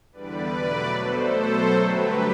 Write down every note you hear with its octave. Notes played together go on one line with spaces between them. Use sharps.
E2 D3 G3 B4 D5
B2 F#3 A3
B2 A3 A4 C5
B2 F#3 A3
G2 D3 F#3 A3 G4 B4